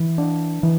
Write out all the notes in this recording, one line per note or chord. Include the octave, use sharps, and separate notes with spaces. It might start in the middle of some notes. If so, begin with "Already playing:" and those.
Already playing: E3
D4
E3